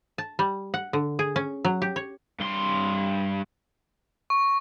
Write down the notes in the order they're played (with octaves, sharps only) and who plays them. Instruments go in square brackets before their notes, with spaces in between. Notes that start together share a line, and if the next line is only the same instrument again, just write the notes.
[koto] A5
G3
F#5
D3
G#4
C#4
F#3
G4
C#5
[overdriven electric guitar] G2 C6
[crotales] C#6